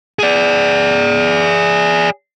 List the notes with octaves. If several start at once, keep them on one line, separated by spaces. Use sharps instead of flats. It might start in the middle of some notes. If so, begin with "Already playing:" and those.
G#4 D5